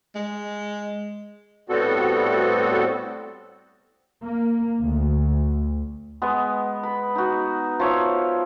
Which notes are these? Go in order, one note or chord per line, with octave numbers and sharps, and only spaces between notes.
G#3
A2 G3 B3 C4 F#4 A4
A#3
D2
G#3 B3
B5
D#4 F#4
F3 C#5 E5